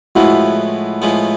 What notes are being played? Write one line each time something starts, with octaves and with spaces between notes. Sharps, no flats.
A2 F3 G#3 B3 E4 F#4
A2 F3 G#3 B3